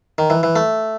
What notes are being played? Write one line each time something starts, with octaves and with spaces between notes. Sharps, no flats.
D#3
E3
E3
A3